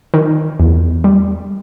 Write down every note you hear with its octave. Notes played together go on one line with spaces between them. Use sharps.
D#3
E2
G3